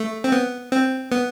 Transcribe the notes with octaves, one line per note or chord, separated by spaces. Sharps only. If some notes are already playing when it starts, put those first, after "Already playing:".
Already playing: A3
C4
B3
C4
B3